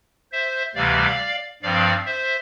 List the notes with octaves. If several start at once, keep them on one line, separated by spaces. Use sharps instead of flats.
C5 E5
D2 C3 E3 G3 D5 F5
G2 F3 C4 D5 F5
C5 E5